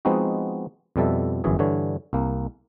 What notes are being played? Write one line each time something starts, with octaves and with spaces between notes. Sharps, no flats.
F3 G#3 B3 C4 D#4 F#4
F2 B2 G3 A4 E5
G1 F#2 E3 G#4
G2 D3 E3 C#5
C2 A#3